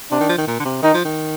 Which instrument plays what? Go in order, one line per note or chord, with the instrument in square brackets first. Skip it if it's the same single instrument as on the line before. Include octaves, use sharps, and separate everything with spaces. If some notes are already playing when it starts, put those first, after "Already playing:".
[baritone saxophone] C3 [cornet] D4
[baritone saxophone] D#3
F3
D#3
A#2
D3
C3
[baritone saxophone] D#3 [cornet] D#4
[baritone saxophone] F3
D#3